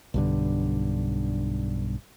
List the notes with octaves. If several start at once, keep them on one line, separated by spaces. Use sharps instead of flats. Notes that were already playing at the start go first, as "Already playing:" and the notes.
B1 G2 D3